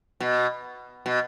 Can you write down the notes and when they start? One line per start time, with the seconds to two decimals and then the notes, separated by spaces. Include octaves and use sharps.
0.20 B2
1.06 B2